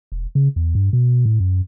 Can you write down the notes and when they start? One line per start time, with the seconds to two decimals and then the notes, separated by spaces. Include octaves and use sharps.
0.12 E1
0.35 C#3
0.56 E2
0.75 G2
0.93 B2
1.26 A2
1.40 F#2